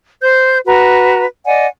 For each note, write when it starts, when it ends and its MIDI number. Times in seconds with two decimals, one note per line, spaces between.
0.22 0.59 72
0.22 0.59 91
0.66 1.24 66
0.66 1.24 71
0.66 1.24 82
1.46 1.66 74
1.46 1.66 75
1.46 1.66 78
1.46 1.66 80